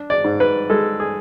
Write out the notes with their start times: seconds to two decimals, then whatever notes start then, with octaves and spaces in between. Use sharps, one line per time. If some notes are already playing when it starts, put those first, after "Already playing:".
Already playing: D4
0.10 D5
0.24 G#2
0.40 B4
0.70 G#3 A4
1.00 G#4